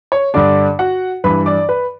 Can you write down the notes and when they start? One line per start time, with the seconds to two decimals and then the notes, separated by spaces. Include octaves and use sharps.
0.12 C#5
0.34 G2 D3 D4 D5
0.79 F#4 F#5
1.24 G2 E3 B4 B5
1.46 D5 D6
1.69 B4 B5